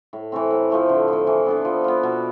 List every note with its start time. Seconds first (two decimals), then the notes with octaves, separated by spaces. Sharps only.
0.13 A2
0.32 E3 A3 C4
0.51 A2
0.70 F3 A3 E4
0.89 D3
1.08 F3 A3
1.27 E3
1.46 B3 D4 A4
1.65 F3
1.84 B3 F4
2.03 B2